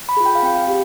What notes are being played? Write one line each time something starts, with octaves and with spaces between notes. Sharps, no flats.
B5
F4 G#4
G5
F5
C4 G5
G4